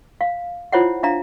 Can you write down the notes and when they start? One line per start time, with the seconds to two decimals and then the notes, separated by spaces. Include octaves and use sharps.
0.21 F5
0.72 E4 F4 C5 C#5 E5 F#5
1.03 D4 E5 F5 A#5